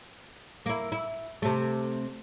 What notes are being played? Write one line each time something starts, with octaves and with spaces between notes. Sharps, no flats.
A#3 E4
E4
C3 A3